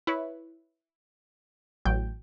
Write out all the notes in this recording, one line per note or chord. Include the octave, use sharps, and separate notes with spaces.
E4 B4 C#5
A1 F#3 G5